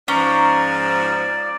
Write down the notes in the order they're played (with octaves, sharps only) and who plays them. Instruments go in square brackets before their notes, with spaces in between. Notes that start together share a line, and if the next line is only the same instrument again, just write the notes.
[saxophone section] G#2 F3 [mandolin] C#4 [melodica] D5 [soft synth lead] A#5